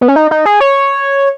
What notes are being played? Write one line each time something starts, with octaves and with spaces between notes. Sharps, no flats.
B3
C#4
D#4
D#4
G#4
C#5